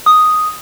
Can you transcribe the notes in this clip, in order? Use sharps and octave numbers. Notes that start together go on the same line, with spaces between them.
D#6